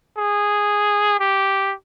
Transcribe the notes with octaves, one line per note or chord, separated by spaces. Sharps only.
G#4
G4